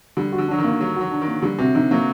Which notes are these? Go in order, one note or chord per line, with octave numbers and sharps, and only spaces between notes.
D3 G3
F#4
D3
F#3 D4
D#3
A#3
F#3 G3
F#3 F#4
D4
D#3
A#3
D3 G3
C3 F#4
D3 D#4
F#3 A#3